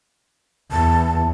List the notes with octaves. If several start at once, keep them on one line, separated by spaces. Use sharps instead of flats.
E2 A5